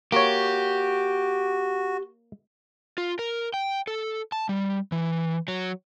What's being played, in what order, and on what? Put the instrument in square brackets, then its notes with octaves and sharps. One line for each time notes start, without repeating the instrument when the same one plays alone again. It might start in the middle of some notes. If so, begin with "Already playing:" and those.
[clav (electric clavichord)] A#3 C#5 [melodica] F#4 [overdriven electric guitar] G4
[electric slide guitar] F4
A#4
G5
A4
A5
G3
E3
F#3